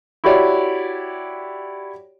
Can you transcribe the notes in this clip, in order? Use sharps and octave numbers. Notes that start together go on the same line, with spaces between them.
E4 F#4 G4 C#5 D5